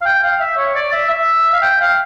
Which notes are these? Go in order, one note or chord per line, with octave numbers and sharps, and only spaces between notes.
F5
G5
F5
E5
C#5
D5
E5
E5
F5
G5
F5